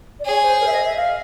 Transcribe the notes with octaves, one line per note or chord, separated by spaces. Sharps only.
D5
G#4 C#5
C5
A#4
E5
D#5
E5
F5